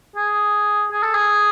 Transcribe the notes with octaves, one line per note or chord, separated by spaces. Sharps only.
G#4
G#4
A4
G#4